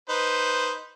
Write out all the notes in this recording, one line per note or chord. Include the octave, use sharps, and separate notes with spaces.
D#4 B4 C5